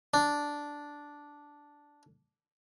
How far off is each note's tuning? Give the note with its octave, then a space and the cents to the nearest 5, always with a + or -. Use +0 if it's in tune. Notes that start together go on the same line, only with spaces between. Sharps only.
D4 -5